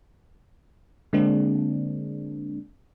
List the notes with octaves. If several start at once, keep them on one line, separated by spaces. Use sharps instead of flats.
D3 G#3 A#3 C4 D4